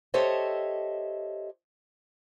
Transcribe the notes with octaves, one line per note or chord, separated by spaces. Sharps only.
G4 A4 C5 C#5 D#5 E5